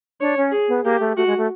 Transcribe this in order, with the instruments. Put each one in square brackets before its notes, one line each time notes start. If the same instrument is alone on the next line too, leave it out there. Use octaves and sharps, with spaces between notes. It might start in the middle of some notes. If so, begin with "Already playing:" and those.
[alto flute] D4 [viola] C#5
[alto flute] C#4
[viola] G#4
[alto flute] B3
[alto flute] A#3 [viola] G4
[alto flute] A3
[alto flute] A3 [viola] F#4
[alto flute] G#3
A3